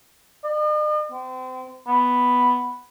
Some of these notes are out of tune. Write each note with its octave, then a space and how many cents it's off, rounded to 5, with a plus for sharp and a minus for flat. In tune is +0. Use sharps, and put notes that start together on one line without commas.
D#5 -45
C4 -30
B3 +0